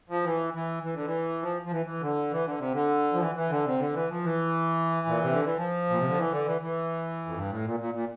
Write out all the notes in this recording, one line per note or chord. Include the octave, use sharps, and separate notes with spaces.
F3
E3
E3
E3
D3
E3
F3
F3
E3
E3
D3
E3
D3
C3
D3
F3
E3
E3
D3
C3
D3
E3
F3
E3
A#2
C3
D3
E3
F3
A#2
C3
D3
E3
D3
E3
E3
F2
G2
A2
A#2
A#2
A#2